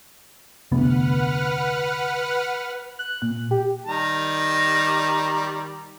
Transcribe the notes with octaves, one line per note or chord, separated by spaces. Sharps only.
F1 D2 B3 B4 F#5 F6
F#6
A#2
G4
D#3 G3 A#5